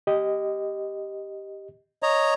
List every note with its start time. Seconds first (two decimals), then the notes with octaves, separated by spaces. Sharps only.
0.07 G4 D#5
2.03 C#5 D#5 A#5